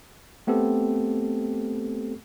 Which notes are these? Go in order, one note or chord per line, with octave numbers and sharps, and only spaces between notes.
A3 B3 C4 G4 A4